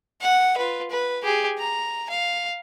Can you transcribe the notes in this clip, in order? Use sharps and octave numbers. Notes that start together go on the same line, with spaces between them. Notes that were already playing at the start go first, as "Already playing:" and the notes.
F#5
F4 B4
B4
G4 G#4
A#5
F5